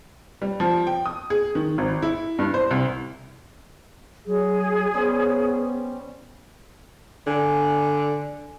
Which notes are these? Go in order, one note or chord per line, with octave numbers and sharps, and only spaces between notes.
G3
F3
G5
D#6
G#4
D#3
G#1
E4
G2
C5
C2
F#3 G#4
G3 B3 C#4 C5
D3 G#5